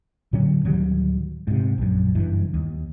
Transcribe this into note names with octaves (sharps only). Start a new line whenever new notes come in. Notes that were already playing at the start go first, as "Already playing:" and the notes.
A2 D3 F#3 C#4
D1 D#3 F#3 G3
G#2 C3
A#1 F#2
F#1 G2 E3
D#2